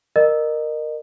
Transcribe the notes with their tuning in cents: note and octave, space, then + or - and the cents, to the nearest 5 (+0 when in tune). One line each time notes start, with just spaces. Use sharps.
A#4 +0 D#5 -30